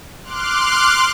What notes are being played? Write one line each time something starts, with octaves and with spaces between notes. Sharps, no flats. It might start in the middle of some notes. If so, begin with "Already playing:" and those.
C6 D6 F6 F#6